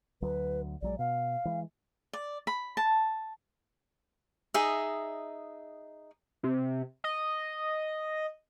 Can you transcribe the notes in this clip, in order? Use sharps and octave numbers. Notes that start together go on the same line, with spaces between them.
D2 F#3 B4
A#1 F#3 G#3 D5
B2 F5
E3 G#3
D5
B5
A5
D#4 G#4 D#5 E5
C3
D#5